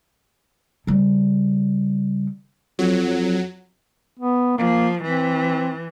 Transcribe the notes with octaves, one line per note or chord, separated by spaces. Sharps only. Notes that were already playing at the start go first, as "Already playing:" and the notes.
C#3 G3
F2 F#3
B3
F3 A#3
E3 C4